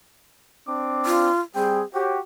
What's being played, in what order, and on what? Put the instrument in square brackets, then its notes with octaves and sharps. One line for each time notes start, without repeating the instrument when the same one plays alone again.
[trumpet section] C4 D4 D6
[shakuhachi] F4
[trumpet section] G3 C4 G5 [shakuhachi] G#4
[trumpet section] F#4 G4 [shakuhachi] C#5